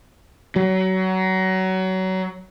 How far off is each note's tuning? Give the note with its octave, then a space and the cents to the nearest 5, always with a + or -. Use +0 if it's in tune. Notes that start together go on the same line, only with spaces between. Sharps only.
F#3 +25